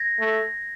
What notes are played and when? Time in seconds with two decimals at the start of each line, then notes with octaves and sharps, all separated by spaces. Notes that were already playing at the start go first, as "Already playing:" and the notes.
Already playing: G#6 A#6
0.19 A3